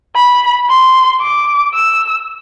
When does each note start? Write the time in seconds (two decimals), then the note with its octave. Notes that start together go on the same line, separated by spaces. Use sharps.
0.15 B5
0.69 C6
1.21 D6
1.74 E6